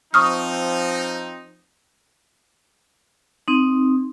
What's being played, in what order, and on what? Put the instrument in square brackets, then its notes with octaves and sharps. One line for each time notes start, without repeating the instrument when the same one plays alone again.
[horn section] F3 C4 D#4 [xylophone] C#6 D#6 F6
[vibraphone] C4 D#4